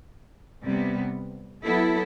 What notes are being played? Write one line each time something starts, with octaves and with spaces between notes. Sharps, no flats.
C3 G3 B3
F#3 B3 E4 A4